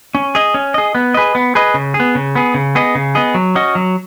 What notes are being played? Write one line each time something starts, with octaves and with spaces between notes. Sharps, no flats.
C#4
G#4 D#5
C#4
G#4 D#5
B3
G#4 B4 D#5
B3
G#4 B4 D#5
C#3
G#4
B3
C#3
B3 G#4
C#3
B3 G#4 D#5
C#3
B3 G#4 D#5
F#3
C#4 F#4 D#5
F#3